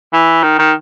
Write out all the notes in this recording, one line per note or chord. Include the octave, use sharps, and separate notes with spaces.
E3
D#3
D#3